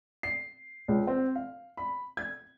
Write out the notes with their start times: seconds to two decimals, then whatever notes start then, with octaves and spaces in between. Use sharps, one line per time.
0.23 C7
0.88 C#2
1.07 C4
1.35 F5
1.77 B5
2.17 G#6